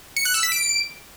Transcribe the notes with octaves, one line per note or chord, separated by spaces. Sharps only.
C#7
F#6
E6
B6
D7